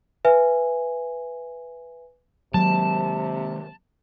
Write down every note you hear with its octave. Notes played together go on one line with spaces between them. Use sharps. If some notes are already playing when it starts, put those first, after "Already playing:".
B4 E5 G#5
C3 D#3 F#3 G#3 A#3 A5